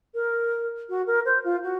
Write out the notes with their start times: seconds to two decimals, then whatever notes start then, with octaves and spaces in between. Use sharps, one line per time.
0.14 A#4
0.89 F#4
1.06 A#4
1.25 C5
1.44 F4
1.63 F#4